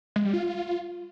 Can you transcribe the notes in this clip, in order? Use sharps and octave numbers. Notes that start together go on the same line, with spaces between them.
G#3
G3
F4